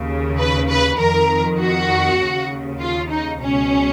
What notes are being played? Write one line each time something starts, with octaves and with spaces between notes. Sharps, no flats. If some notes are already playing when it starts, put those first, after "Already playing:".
Already playing: D#2 C#3
B4
B4
F2 D#3 A#4
F#4
D#2 C#3
F4
D#4
C#2 B2 C#4